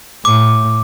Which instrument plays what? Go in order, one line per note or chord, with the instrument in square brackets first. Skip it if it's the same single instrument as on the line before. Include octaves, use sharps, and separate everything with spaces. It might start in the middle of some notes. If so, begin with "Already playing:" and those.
[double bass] A2 [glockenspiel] D6